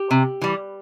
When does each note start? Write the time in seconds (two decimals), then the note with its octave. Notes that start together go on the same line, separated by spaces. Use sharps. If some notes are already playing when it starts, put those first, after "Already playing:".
Already playing: G4
0.11 C3
0.41 E3 G3